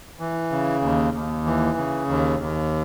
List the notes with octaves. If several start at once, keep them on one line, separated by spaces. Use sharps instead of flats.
E3
C#3
D#2
D#2
E3
C#3
D#2
D#2